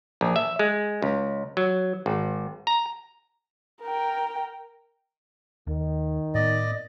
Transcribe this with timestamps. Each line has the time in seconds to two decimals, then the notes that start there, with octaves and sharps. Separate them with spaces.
0.21 A#1
0.36 E5
0.59 G#3
1.02 C#2
1.57 F#3
2.06 G#1
2.67 A#5
3.82 A#4 G5
5.67 D#2 D#3
6.35 A2 B3 D5 D#5